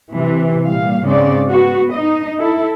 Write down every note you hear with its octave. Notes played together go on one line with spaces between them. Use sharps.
C3 E3
A#2 G3 F5
G#2 C#3 C4 D5
B3 F#4
D#4 D#5
E4 A4